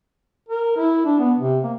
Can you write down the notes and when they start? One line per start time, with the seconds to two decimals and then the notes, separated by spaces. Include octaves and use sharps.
0.48 A#4
0.77 E4
1.06 D4
1.19 B3
1.40 C3
1.63 A#3